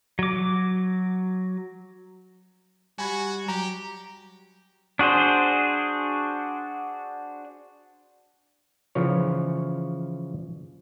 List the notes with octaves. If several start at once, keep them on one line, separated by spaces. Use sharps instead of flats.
F#3 D6
G3 F#4 G#5 B5 G#6
F#3 G4 A#5
D4 F#4 G#4 C5
C#3 E3 F3 C#5